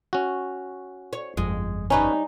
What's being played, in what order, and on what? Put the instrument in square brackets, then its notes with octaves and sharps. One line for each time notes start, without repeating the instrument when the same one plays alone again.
[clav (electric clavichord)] C#4 F#4
[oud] C#5
[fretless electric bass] G1 F2 [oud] G#3
[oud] G3 D#4 C#5 [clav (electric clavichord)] C#4 B4 [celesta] G#5 A#5